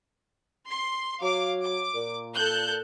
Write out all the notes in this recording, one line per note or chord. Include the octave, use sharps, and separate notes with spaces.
C6
F#3 F5 D6
D6
A#2
A4 F#6 G6